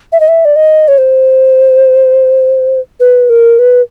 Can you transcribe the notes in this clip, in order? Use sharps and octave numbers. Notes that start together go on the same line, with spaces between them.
E5
D#5
E5
D5
D#5
C#5
C5
B4
A#4
B4